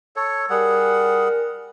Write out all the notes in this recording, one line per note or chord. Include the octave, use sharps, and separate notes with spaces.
A4 C#5
G3 G#4 A#4 F#5